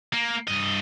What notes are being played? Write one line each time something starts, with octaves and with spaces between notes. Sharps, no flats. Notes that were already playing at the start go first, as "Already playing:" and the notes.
A#3
G2 D#5